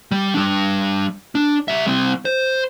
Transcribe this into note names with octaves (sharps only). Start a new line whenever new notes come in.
G3
G3 D4
D4
G3 E5
G3 C4
C5